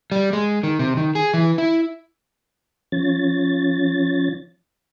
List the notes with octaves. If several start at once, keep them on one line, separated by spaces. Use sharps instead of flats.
G3
G#3
D#3
C3
D#3
G#4
E3
E4
F3 C#4 A6